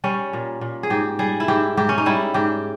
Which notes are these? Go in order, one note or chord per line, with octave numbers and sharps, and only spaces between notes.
G3 C#4
A#2
A#2
G#4
G#2 G4
G3 G#4
E4
G#2 G4
G#2 G4
C#4
D#4
G3 E4
G#2 G4